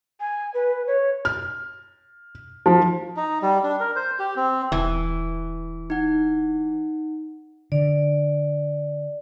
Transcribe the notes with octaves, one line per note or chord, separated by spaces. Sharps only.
G#5
B4
C#5
F6
F3
D#4
G3
D4
A#4
C5
G4
C4
D#1 E3
D#4 F#5
D3 D5